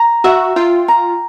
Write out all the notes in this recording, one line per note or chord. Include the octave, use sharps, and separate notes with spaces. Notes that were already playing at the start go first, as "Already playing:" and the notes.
Already playing: A#5
F#4 E5
F4 G5
A#5